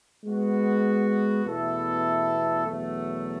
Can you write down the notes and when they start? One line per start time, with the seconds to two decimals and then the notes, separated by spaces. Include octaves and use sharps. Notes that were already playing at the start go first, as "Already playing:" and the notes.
0.24 G#3 B3 F#4
1.46 E2 B2 A3 E4 A4
2.66 E2 B2 F#3 A3